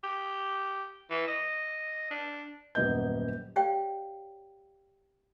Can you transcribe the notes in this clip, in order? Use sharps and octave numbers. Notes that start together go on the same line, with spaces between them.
G4
E3
D#5
D4
D#1 F#2 B3 D#5 G6
G4 C#5 D5 F5 G5